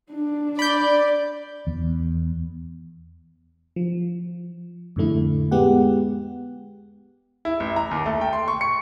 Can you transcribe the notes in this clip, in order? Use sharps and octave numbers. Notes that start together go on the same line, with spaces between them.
D4
D5 B5 G6
E2
F3
F2 A2 D3 A3 E4
G#3 B3 G4 F#5
E4
A1
A#5
D#2
A3
G5
C6
C#6
C#7